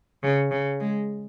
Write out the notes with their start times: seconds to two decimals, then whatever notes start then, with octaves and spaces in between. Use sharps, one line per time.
0.23 C#3
0.51 C#3
0.80 G#3